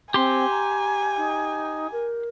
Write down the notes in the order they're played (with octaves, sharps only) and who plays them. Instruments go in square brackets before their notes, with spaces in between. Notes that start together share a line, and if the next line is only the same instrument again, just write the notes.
[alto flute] C4 [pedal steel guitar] G4 C6 [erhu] G#5
[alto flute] A#5
D#4
A#4